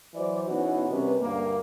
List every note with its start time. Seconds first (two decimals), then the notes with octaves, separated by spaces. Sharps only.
0.14 E3 F#3 C5 D5
0.48 B2 E3 B3 C#4 D#4 F#4
0.90 C3 G3 C#4 A#4 B4
1.19 D2 G2 A#3